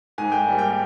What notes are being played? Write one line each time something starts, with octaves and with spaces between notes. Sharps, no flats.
G#2 G#5
G5
G#5
G3 A#3
G5